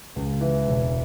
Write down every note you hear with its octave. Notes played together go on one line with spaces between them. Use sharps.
C#2
E3
E1